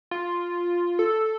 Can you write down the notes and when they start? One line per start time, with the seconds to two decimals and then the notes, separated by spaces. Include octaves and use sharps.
0.11 F4
0.99 A4